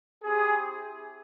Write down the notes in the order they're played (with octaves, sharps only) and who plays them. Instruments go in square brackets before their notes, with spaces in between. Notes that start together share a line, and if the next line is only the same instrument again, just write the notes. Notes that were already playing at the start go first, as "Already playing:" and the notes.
[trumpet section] C4 E4 G4 G#4